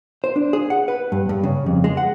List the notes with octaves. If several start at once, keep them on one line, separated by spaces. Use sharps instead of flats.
C5
D4
G#4
F#5
B4
G2
G2
C#3
F2
G#3
F#5